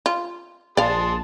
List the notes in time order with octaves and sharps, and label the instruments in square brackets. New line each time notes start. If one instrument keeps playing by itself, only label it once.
[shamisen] F4
[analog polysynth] A#1 A5 [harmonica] G#4 C6 [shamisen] D5 F5